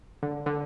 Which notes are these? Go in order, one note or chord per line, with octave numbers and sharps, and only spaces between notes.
D3
D3